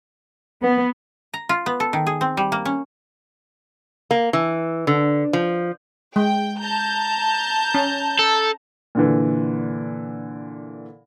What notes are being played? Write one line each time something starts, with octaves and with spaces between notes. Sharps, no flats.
B3
A#5
F4
B3
A4
D#3
G#4
C4
G3
A#3
C#4
A#3
E3
D3
F3
G#3 G5
A5 A#5 G6
C#4
A4
A#2 D3 E3